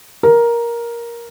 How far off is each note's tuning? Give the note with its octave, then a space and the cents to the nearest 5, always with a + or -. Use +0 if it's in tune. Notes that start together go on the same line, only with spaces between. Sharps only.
A#4 +10